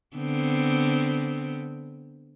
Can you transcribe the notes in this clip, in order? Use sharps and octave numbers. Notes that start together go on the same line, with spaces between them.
D3 B3 C4